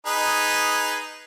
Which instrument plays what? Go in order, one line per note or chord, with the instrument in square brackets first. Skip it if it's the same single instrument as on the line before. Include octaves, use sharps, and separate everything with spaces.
[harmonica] D#4 G#4 B4